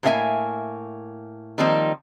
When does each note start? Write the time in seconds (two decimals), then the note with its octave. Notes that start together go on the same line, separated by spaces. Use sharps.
0.03 A2 A#3 B3 D4 E5 G#5
1.58 D#3 F3 G3 A#3 C4 D#4